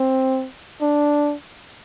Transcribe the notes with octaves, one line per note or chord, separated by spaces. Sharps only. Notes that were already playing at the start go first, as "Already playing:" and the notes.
Already playing: C4
D4